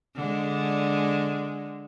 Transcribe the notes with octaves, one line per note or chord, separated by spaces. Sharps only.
D3 G#3